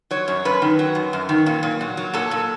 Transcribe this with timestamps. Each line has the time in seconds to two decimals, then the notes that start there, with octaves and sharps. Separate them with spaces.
0.11 F#3 C#5
0.28 F#2
0.45 F#2 B4
0.62 D#3
0.79 F#3
0.95 F#2
1.13 F#2
1.29 D#3
1.46 A#2
1.63 A#2
1.81 F#3
1.97 F#3
2.14 A#2 A4
2.31 A#2